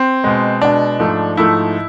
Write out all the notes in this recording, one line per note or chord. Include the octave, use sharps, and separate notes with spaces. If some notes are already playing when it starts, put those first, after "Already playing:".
Already playing: C4
B2 G#3
B2 G#3 D4
G#2 F3 A3
G#2 F3 A3 E4